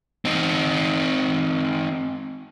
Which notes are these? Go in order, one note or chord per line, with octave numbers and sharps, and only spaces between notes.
C4 D#4